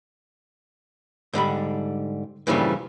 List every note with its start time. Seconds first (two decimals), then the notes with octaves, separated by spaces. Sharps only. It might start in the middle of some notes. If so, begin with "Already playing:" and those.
1.33 G#2 D3 G3 B5
2.47 G2 A#2 C#3 E3 F3 G3